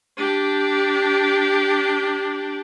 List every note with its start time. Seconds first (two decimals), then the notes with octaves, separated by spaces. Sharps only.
0.17 D4 G4